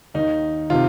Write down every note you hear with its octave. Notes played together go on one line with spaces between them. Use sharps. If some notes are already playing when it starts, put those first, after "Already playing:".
D#2 D#3 D#4
C3 D#3 F4